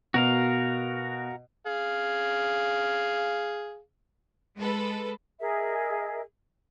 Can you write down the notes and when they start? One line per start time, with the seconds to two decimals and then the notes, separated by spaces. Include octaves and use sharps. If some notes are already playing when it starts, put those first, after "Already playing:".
0.14 B2 F#4 A#4 F5
1.67 G#4 F5
4.58 G#3 A4 B4
5.40 G#4 A#4 D#5 E5